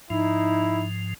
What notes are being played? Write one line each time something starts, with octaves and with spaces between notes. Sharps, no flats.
G#2 F3 D#4 E4